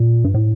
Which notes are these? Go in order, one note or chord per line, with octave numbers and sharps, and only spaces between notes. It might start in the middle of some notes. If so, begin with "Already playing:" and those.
Already playing: A#2
G2
A2